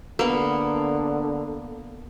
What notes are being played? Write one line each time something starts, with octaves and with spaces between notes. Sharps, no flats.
D3 A#3 B3